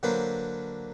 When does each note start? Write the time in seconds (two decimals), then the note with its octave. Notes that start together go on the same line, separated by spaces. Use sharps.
0.03 D3 F#3 A#3 B4 C5